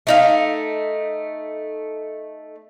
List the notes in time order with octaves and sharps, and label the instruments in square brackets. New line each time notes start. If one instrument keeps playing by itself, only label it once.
[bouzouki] A3 D#4 F5